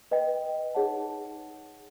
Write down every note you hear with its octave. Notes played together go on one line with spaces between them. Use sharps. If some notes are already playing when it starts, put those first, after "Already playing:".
B4 D#5 G5
D#4 G#4 C#5 F#5 A5